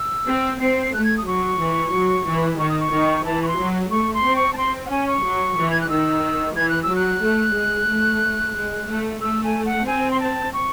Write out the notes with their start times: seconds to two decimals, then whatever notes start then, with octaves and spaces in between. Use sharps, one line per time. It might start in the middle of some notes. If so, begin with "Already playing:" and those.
Already playing: E6
0.27 C4
0.60 C4 C7
0.82 C7
0.94 A3 F#6
1.04 G#6
1.17 D#6
1.27 F#3 C#6
1.60 E3
1.93 F#3
2.26 E3
2.59 D#3 C#6
2.69 D#6
2.80 C#6
2.93 D#3
3.25 E3 A5
3.43 C#6
3.48 C6
3.58 F#3
3.91 A3 C#6
4.14 C6
4.25 C4
4.36 C#6
4.53 A5
4.57 C4 C6
4.86 F#5
4.90 C#4 G#5
5.07 C#6
5.23 F#3
5.58 E3
5.71 G#6
5.81 F#6
5.89 D#3 E6
6.56 E3 G#6
6.69 F#6
6.83 E6
6.89 F#3
6.96 F#6
7.22 A3
7.55 G#3
7.89 A3
8.55 G#3
8.88 A3
9.21 A3 E6
9.44 G#5
9.65 F#5
9.87 C4 G#5
10.11 C6
10.20 A5
10.53 C#6